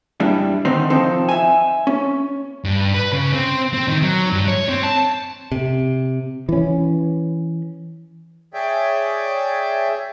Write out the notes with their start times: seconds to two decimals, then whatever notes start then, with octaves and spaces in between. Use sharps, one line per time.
0.20 G2 G3 D4 E4
0.65 D3 D#3 C4 D#4 C5
0.90 C3 F3 C4 D#4 A4 C5
1.29 E5 G#5
1.87 C#4
2.65 G2
2.94 B4
3.13 C#3
3.34 C4
3.74 C4
3.88 D#3
4.02 F#3
4.33 G2
4.48 C#5
4.69 C4
4.83 A5
5.52 C3
6.49 E3 C#4
8.54 G#4 C#5 D5 E5 G5